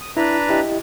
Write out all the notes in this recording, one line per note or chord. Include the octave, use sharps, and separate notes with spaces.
D#6
D4 E4 B4 A#5
E4 G4 D#5